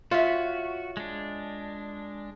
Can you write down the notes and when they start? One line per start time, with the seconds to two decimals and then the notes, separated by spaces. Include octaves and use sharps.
0.11 F4 F#4 C#5 E5
0.97 G#3 D4